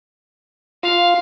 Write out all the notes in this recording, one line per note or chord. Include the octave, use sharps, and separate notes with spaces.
F4 F5